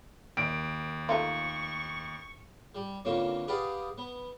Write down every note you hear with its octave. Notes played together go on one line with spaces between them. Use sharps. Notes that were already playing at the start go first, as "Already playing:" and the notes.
D#2 D7
A3 D#4 F4 C#6
G3
F2 D3 E3 F#3 A#3 C#4
G4 G#4 B4 D5 F5 F#5
B3